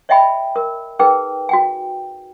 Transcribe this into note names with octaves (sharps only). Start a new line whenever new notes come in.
C#5 D#5 E5 G5 G#5 B5
A#4
D#4 G#4 A#4 B4 G5
F#4 G5 G#5